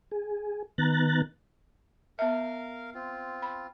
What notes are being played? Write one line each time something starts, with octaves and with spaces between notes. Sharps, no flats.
G#4
D#3 B3 A#5 F#6 A6
B3 A#4 E5 F5
C4 F4
B5